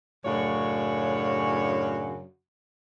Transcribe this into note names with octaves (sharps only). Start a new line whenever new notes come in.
F#2 A2 C#3 D4 F#4 C#5